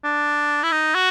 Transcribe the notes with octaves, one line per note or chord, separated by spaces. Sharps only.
D4
E4
D#4
F#4